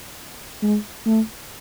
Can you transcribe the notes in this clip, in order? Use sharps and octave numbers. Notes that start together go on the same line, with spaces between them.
G#3
A3